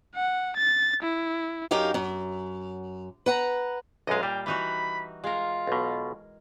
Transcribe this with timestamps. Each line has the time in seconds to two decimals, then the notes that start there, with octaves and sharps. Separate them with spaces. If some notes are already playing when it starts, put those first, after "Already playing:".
0.15 F#5
0.57 A6
1.03 E4
1.71 F#2 D#4 G4 A#4 F5
1.94 F#2
3.26 B4 F#5 A#5
4.07 B1 F#2 G#3 D#5 F5
4.23 A#2 G3 G5
4.46 E3 D#4 F#4 B5
5.24 G#3 F4 A#4
5.67 B1 B2